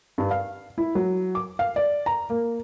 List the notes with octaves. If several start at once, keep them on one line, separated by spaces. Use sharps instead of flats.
G2
F5
E4
F#3
D6
F5
D5
A#5
A#3